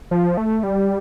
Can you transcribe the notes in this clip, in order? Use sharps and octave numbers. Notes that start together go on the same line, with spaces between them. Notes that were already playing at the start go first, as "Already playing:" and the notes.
F3
A3
G3